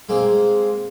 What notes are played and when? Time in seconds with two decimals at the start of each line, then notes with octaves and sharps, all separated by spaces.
0.09 G#3 A#3 C4